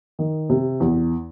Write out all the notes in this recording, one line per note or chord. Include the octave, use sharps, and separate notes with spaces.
D#3
C3
E2